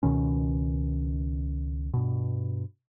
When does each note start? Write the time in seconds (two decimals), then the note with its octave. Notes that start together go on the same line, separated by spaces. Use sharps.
0.03 C#2 B2 D#3 C#4
1.94 G2 B2